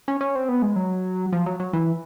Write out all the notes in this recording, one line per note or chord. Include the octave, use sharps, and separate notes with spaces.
C#4
C#4
C4
B3
G#3
F#3
F3
F#3
F#3
E3